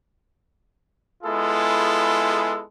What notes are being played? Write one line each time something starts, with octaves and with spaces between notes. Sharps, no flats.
G#3 B3 E4 F4 G#4 A4